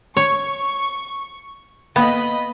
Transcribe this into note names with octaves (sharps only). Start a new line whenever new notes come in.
C#5 C#6
A#3 B3 D#5 F5 B5